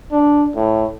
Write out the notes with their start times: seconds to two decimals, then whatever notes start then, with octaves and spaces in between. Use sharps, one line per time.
0.11 D4
0.55 A2